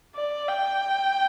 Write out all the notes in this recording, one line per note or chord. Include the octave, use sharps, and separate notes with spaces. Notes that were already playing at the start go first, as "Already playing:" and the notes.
D5
G5